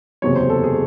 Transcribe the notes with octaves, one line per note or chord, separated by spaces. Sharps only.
F#1 E2 C3 F#3 C#5
C5
A4
G#4